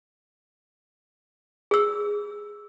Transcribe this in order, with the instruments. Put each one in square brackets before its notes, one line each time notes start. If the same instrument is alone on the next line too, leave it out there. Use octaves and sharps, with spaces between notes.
[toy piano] G#4 E6